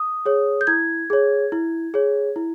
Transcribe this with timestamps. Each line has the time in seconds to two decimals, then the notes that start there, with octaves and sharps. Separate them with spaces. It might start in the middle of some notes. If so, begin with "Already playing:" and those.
Already playing: D#6
0.26 G#4 C#5
0.61 G6
0.67 E4 G#6
1.10 G#4 C#5
1.52 E4
1.94 G#4 C#5
2.36 E4